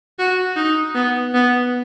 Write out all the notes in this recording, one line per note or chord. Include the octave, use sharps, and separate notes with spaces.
F#4
D#4
B3
B3